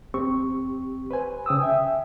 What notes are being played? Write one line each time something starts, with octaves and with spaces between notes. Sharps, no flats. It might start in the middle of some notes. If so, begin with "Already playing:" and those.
E2 C4 G4 C#6
B4 C5 G#5
C#3 G5 D#6 E6
E5 G5 G#5